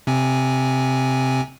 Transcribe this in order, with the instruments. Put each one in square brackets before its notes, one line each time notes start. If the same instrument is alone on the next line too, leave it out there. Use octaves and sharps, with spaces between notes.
[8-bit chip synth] C3 C4 G#5